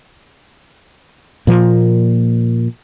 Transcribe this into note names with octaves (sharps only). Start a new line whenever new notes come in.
A#2 F3 A#3